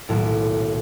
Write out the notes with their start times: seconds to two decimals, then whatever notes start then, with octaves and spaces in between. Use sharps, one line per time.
0.08 D#1 B1 A2 D7